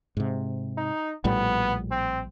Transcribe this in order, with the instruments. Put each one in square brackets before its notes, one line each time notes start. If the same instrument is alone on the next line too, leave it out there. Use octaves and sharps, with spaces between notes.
[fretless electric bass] G#2 C3
[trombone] D#4
[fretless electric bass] A#1 A2 G3 [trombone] B3
[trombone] C4